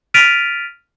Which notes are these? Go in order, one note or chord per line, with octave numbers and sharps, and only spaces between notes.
F6 A6 B6 D7 D#7 F7